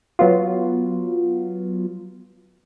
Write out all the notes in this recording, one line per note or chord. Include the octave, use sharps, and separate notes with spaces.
F#3 B3 F4